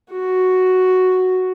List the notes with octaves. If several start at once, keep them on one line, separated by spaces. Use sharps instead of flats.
F#4